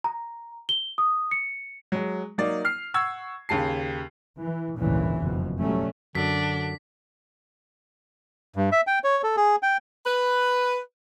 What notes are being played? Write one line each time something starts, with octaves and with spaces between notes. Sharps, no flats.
A#5
G7
D#6
C#7
F#3 G#3
F#3 A#3 D#4 D5
F6 C7
F#5 C#6 E6 G#6
D#2 C#3 A5 C7
E3
G#1 D2 G2 A#2 C#3 E3
F#1 F2 B2
F#3 G3 A3 C#4
F#2 D3 D4 B6
G2
E5
G5
C#5
A4
G#4
G5
B4